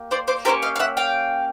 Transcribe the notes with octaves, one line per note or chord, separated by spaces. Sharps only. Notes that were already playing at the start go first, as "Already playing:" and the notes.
Already playing: A#3 G4
C5 D5
C5 D5
A#3 C#4 E4 G4 A#4 C5
D#5 F5
F5
E5 F#5
F5 G5